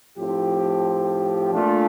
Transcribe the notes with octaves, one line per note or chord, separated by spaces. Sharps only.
A2 F3 C4 G4
A#2 A3 D4 F4